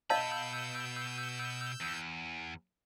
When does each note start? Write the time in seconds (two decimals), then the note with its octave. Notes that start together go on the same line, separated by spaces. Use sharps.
0.10 B2 D#5 F5 A5 B5 E6 G6
1.81 E2